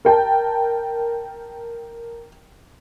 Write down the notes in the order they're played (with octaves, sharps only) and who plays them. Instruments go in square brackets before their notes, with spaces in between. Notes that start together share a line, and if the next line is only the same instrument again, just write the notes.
[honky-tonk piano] A#4 G5 A5